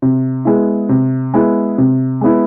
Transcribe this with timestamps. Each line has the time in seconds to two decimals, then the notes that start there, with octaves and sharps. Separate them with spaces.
0.02 C3
0.45 G#3 B3 E4
0.89 C3
1.34 G#3 B3 E4
1.78 C3
2.21 G#3 B3 E4